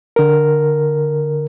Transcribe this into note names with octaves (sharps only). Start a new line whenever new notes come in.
D3 A#4